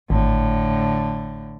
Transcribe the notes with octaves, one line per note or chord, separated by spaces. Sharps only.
G#1 A2 D3